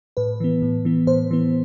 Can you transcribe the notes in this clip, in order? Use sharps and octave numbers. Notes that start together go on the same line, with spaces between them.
A2 B4
E3 B3
A2
E3 B3
A2 C5
E3 B3